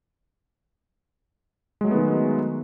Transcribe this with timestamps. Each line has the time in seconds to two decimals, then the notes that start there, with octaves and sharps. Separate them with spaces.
1.81 G#3
1.84 F#3
1.88 A3
1.91 B3
1.94 D#3